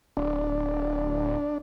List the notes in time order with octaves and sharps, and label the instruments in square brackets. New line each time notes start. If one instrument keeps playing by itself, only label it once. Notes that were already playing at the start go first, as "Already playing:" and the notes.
[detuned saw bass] D1 [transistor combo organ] D4